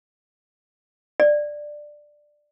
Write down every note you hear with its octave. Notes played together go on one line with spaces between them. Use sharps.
D5